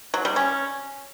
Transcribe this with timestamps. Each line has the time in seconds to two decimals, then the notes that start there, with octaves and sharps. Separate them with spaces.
0.14 F#3
0.25 G3
0.36 C#4